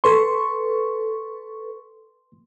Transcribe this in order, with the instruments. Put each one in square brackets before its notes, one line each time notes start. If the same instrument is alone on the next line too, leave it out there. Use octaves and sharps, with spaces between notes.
[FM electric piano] A4 B4 C#6 [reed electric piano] C6